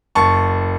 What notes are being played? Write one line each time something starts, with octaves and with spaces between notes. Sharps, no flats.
F#1 A5 C#6